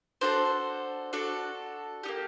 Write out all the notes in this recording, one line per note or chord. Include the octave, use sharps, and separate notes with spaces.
D4 F#4 A4 C5
D4 F#4 A4
A#3 D#4 G4